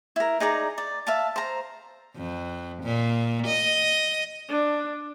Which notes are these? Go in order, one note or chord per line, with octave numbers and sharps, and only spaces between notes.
E4 A#4
D#4 G#4 D5 A#5
D5
E5 F5 A5
C5 A#5
F2
A#2
D#5
D4